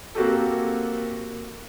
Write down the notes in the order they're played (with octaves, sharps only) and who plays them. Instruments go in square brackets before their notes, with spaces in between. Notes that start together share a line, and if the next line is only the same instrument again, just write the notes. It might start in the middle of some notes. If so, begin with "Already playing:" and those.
[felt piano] A#3 C4 F#4 G4 A4